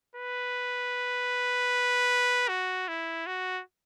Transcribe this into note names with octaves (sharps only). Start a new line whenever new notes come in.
B4
F#4
E4
F#4